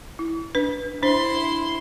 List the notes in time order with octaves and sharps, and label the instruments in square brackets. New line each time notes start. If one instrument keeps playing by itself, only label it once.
[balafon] E4
D4 B4
[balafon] D4 C5 [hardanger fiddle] E4 C6